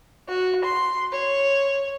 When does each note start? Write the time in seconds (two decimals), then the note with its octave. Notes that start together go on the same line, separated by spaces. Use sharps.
0.28 F#4
0.64 C6
1.12 C#5